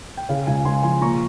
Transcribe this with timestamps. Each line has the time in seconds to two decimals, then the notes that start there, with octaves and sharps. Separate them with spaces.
0.17 G5
0.29 C#3 C#5 F5
0.47 C#2 F5 G#5
0.65 C#2 G#5 C6
0.83 F3 G#5 C6
1.01 A#2 A#5 C#6